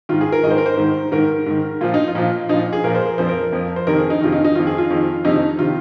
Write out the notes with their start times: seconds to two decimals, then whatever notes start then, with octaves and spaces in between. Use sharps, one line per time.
0.09 G#2 D#3 F4
0.21 G#4
0.32 A#4
0.43 G#2 D#3 D#5
0.51 C5
0.58 A#4
0.66 C5
0.77 G#2 D#3
1.12 G#2 D#3 A#4
1.46 G#2 D#3
1.81 A#2 F3 F4
1.94 D#4
2.08 F4
2.15 A#2 F3
2.49 A#2 F3 D#4
2.73 G#4
2.84 A#2 F3 A#4
2.95 C5
3.07 A#4
3.18 F2 F3 C5
3.29 A#4
3.52 F2 F3
3.76 C5
3.87 F2 C3 D#3 A#4
3.98 G#4
4.10 D#4
4.21 F2 C3 D#3 F4
4.32 D#4
4.44 D#4
4.55 F2 D#3 F4
4.67 G#4
4.78 F4
4.90 F2 D#3
5.25 F2 C3 D#3 D#4
5.36 D#4
5.59 C3 D#3 F4